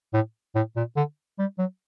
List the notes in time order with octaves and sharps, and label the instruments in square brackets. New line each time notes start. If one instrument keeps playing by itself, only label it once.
[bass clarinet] A2
A2
A#2
D3
G3
F#3